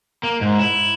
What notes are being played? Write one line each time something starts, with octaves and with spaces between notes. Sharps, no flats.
A#3
G#2
E4